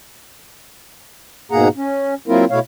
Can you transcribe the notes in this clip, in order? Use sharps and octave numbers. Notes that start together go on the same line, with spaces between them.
G#2 B2 A#3 G#4 F#5 A#5
C#4
F#3 A#3 C4 E4 F4 A#4
B2 A3 E4 C#5 F5